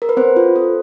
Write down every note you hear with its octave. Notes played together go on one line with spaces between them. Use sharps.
A#4
B4
C4 C5
F4
A4